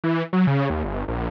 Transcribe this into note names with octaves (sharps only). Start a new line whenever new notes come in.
E3
F#3
C#3
D#2
G1
A#1